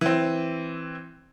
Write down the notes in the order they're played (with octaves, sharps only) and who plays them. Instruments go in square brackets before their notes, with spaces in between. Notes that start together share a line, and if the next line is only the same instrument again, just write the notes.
[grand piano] E3 C4